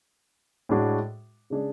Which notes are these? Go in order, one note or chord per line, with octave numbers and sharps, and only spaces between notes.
A2 G#3 D4 F#4
C#3 G#3 D4 G#4 D5